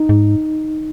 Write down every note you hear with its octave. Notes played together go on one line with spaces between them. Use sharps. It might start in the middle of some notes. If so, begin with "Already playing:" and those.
Already playing: D#4
G#2